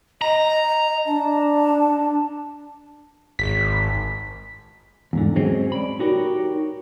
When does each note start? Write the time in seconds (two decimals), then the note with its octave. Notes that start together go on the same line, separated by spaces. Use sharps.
0.22 D#5 A#5
1.06 D4 A5
3.39 G#1 B6
5.13 E2 G#2 D3
5.36 F#3 G#3 C4 C#4
5.72 D5 B5
5.99 D#4 F#4 G4 A#4 C#5